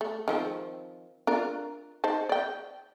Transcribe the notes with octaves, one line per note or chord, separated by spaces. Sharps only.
A3
D#3 F3 C4
D4 F4 A#4
D#4 C5 A5
D5 G5